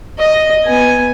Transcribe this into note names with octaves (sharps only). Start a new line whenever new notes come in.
D#5
B3 G#5